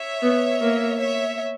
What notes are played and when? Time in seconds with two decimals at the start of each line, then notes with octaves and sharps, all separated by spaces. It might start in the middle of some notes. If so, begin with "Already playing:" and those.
Already playing: C#5 E5
0.22 B3
0.61 A#3
0.99 C#5 E5